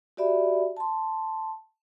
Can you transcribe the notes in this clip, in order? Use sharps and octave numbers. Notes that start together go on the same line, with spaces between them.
F#4 G4 D5 E5 B5
A5 C6